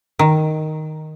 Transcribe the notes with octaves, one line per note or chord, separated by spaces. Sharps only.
D#3